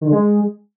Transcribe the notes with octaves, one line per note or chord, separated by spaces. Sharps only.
D#3
D3
G#3